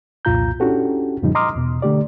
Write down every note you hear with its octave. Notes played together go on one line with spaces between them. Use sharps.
C2 F2 A#2 F4 A#5 G6
C#4 D4 E4 F#4 G4 A4
F2 A2 C#3 F3 G3 D#4
D#5 A#5 C6 D6 D#6 F6
E2 B2
D3 A3 G4 D5